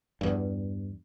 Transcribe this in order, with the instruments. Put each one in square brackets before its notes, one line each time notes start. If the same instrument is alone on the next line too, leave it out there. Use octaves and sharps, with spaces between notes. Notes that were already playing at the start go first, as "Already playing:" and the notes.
[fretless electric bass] E2 G2